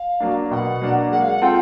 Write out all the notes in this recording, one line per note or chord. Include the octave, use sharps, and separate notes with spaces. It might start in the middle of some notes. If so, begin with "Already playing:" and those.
Already playing: F5
F#3 A#3 D4
B2 F#5 G5
F#3 A#3 D4
G#3 F#5
F5
F#5
C4 F4 A4 G5